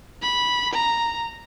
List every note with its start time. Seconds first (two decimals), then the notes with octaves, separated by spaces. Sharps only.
0.22 B5
0.74 A#5